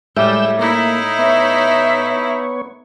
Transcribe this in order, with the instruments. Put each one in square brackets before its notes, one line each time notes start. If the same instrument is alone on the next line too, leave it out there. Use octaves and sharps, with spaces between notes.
[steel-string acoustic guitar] A2 [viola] G3 [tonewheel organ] G#3 E6 G6
[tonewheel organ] A#3 [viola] D#4 E4
[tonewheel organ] B3 C#5 [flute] E5